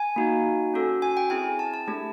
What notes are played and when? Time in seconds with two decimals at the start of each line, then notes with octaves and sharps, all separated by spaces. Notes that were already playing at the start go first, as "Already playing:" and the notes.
Already playing: G#5
0.16 A#3 D#4 F#4
0.74 C#4 F#4 A4
1.02 G#5
1.17 G5
1.30 C4 E4 G#4 G#5
1.59 A5
1.74 A5
1.88 A3 D4 G4